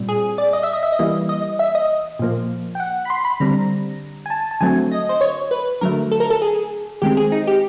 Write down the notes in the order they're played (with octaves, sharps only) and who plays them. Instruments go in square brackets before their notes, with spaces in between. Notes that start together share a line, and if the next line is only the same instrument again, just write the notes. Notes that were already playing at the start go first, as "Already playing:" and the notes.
Already playing: [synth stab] A#2 G3 C4
G#4
D5
D#5
E5
D#5
E5
D#5
E3 G3 A#3
D#5
E5
D#5
A#2 F3 A#3
G5
F#5
B5
C6
B5
D3 G3 C4 A#5
G#5
A5
A5
D3 F#3 A3 C4 G#5
D#5
C5
C#5
B4
D3 F#3 A3 A#4
A4
A#4
A4
G#4
D#3 G#3 C4 G4
G#4
D#4
G4